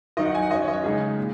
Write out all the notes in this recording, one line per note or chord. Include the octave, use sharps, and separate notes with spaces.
D#3 F#3 D#4 D#5
F#5
G#5
F#5
F#3 C#4 D#5
C#5
D#5
C#5
C#3 G#3 D#4 G#4
A#2